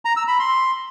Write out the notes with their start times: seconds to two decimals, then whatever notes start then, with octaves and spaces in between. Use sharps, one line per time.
0.05 A#5
0.16 E6
0.28 B5
0.39 C6